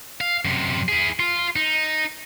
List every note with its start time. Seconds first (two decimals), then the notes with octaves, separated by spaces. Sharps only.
0.21 F5
0.45 F#2 C3
0.89 E4 G#4
1.20 F4
1.56 D#4